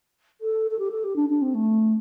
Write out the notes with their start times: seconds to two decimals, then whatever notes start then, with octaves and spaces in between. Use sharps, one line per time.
0.41 A4
0.71 A4
0.79 G4
0.91 A4
1.04 G4
1.16 D4
1.29 D4
1.41 C4
1.54 A3